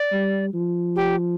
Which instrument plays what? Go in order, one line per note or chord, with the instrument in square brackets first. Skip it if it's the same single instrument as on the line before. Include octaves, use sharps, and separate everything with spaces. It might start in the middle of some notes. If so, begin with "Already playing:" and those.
Already playing: [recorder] D5
[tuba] G3
F3
[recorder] G4